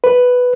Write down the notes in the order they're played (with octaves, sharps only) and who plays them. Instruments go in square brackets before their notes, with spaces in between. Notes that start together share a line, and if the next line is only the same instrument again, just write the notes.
[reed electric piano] B4